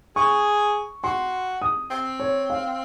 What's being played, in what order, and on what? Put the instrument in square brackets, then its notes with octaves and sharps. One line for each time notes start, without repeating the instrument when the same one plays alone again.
[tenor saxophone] G#4 [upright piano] C#6
[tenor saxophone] F#4 [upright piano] C6
[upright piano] D#6
[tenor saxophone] C4
[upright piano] C#5
F5